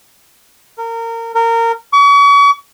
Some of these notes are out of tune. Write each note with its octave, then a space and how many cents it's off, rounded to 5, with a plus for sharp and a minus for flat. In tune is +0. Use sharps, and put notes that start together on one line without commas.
A#4 -25
A#4 -20
C#6 +40